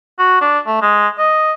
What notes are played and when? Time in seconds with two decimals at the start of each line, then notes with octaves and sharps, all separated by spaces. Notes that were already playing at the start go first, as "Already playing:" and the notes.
0.19 F#4
0.41 D4
0.67 A3
0.82 G#3
1.18 D#5